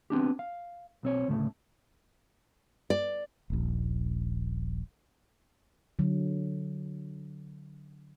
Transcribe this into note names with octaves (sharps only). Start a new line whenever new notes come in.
B3 C4 D4 G4
F5
B1 C4 C#5
D2 A2 C#3 A3
D5
D#1 A#1
D3 F#3